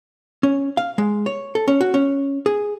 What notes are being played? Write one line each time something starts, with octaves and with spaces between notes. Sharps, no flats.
C#4
F5
G#3
C#5
A4
C#4
F#4
C#4
G#4